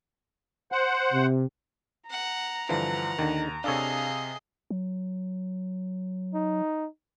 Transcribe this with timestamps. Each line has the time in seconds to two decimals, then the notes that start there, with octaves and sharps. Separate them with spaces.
0.72 C5 F#5
1.13 C3
2.10 F#5 A#5
2.69 G2 D3 E3 F3 F#5
3.19 D#2 D3 D#3
3.64 C3 D4 G#4 A4 C#5 D#5 F5
4.71 F#3
6.34 D#4